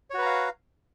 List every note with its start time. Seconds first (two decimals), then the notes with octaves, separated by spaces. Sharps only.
0.10 C#5
0.14 F#4
0.18 B4
0.22 A#5
0.26 F5